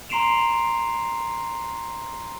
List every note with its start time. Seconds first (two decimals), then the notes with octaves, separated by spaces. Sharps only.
0.09 A#5 C6 C7 D7 E7 F7